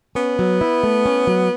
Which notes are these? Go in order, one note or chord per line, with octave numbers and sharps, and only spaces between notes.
B3 C#4
F#3
E4
A3
C#4
F#3